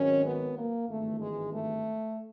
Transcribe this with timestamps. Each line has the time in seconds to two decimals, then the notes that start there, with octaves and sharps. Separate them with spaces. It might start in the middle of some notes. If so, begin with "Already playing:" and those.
Already playing: G#1 G#2 D#3 F#3 C#4
0.24 B3
0.57 A#3
0.88 G#1 G2 E3 A3
1.20 G#3
1.51 A3